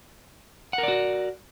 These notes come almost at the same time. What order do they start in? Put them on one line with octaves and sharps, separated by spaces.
F#5 A#4 D5 F#4